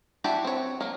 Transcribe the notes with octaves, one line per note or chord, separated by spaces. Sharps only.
D4 E4 F#4 G4 A5
C4 C#5
F#3 A#3